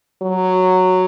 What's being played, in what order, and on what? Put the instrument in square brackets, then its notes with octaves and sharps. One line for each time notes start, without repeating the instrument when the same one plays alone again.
[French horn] F#3